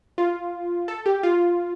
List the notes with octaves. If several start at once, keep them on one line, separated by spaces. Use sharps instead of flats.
F4
A4
G4
F4